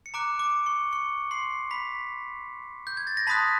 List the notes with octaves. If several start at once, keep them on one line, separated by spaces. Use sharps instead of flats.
C#7
A#5 D6 F#6 D7
D6 D7
C#6 C#7
C#6 C#7
C6 C7
B5 B6
G6
G#6
A6
A#6
A5 B5 C6 D#6 F#6 B6